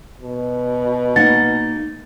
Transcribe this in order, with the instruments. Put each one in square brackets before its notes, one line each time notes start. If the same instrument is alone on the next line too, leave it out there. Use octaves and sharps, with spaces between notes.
[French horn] B2
[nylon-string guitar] A#3 D#4 F#5 [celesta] A6